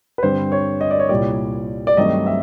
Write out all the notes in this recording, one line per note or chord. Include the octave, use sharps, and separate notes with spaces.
B4
G2 D3 G3 C4 C5
C#5
D#5
D5
C#5
C2 A#2 G3 D5
D5
G2 D#3 F#3 A3 C4 D#5
E5